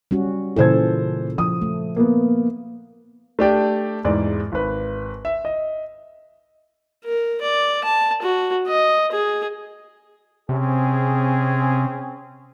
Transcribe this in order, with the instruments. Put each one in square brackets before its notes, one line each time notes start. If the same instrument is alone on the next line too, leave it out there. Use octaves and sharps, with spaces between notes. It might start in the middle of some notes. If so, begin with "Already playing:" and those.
[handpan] G3 C#4 F#4
[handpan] A#2 C#3 A4 [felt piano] E3 C5 G#6
[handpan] F3 [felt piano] D#6
[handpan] A3
[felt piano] A#3 B3
[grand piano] A3 D4 G4 D5
E2 G#2 D5
G#1 B4
E5
D#5
[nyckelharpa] A#4
D5
A5
F#4
D#5
G#4
[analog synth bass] C3 [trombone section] C4 C#4 G#4